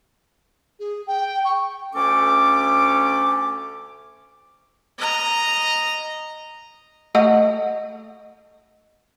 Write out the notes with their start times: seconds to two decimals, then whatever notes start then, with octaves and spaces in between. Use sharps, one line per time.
0.80 G#4
1.07 G5
1.45 C#6
1.94 D2 A3 C#4 A4 D6
4.98 D#5 A#5
7.15 A3 D#5 F#5